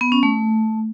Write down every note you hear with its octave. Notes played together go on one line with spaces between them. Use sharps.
B3
C#4
A3